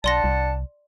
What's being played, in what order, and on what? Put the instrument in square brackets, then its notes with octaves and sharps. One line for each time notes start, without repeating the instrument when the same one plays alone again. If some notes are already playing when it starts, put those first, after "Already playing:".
[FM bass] B1 [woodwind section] D4 F#5 A5 [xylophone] D5 C6 A#6
[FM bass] C2